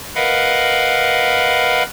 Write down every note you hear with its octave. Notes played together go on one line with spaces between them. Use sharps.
A#4 B4 D#5 F5 F#5 B5